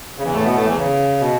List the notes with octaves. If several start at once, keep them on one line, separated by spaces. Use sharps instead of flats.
C#3
E2 E3
A2 A3
B2 B3
A2 A3
E2 E3
C#3
B2